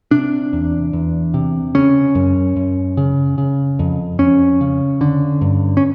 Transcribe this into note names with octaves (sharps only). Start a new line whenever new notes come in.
C3 D4
E2
E2
C3
C#3 C#4
F#2
F#2
C#3
C#3
F2
F2 C#4
C#3
D3
G2
C#4